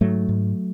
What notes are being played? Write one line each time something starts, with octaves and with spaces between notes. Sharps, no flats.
G#2 F#3 A3
G#2